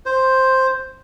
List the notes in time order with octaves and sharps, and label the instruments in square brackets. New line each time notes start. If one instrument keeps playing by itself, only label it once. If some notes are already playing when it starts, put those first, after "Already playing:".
[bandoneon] C5